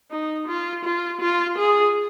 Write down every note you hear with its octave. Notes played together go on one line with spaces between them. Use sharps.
D#4
F4
F4
F4
G#4